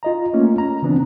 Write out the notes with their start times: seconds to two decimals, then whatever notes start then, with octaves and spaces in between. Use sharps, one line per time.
0.03 F4 D#5 A#5
0.33 A3 A#3 C#4 F4
0.58 A#5
0.82 C#3 E3 B3 C4 D4